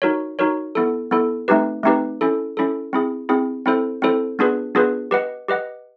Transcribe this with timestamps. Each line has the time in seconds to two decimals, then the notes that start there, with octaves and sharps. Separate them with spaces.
0.02 D#4 F#4 A#4 C#5
0.39 D#4 F#4 A#4 C#5
0.75 B3 E4 A4
1.11 B3 E4 A4
1.48 A3 C4 D#4 G4 B4
1.83 A3 C4 D#4 G4 B4
2.21 C#4 E4 A4
2.57 C#4 E4 A4
2.93 C4 E4 G#4
3.29 C4 E4 G#4
3.66 C4 E4 A4 C5
4.02 C4 E4 A4 C5
4.39 B3 D4 F4 G#4 B4
4.75 B3 D4 F4 G#4 B4
5.11 G4 B4 D#5 F#5
5.48 G4 B4 D#5 F#5